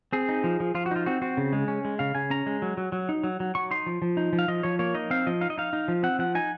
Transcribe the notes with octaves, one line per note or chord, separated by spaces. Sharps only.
C4 G#4
D#4
F3
F3
F3 F4
F#4
D#4 F4
C4 F#4
C4 F#4
C#3
G#3
C#4
G#3
C#3 F5
C#3 G#5
C#4 A#5
G#3
F#3
F#3
F#3
D#4
F#3
F#3
F#3 C#6
D#4 C6
F3
F3
D#4
F3
F5
F3 D#5
F3 C#5
A#3 C#5
D#4 D#5
C4 F5
F3 D#5
D#4 F5
D#5
D#4 F5
D#4
F3
C4 F#5
F3 F#5
D#4 G#5